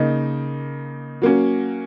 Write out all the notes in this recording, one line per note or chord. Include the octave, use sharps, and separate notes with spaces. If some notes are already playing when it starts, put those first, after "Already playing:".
Already playing: C#3 A#3 D#4
F#3 A#3 C#4